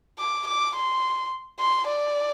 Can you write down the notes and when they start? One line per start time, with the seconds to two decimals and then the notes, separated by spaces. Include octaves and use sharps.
0.18 D6
0.47 D6
0.75 C6
1.59 C6
1.87 D5